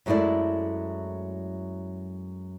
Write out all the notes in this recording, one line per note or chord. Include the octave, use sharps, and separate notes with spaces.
F#2 F#3 G#3 A3 E4 D5